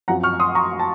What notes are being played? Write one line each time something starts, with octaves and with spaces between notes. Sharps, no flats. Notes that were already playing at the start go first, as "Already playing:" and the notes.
F#2 F3 C4 F#5 A#5
C#6 F6
C6 D#6
A#5 C#6
A5